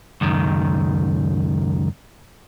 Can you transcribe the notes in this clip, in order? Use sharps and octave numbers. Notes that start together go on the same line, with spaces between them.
C#2 F#2 D#3